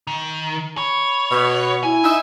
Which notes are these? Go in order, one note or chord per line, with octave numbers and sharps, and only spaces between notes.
D#3
C#5 B5
B2
E4 G#5
D#4 E5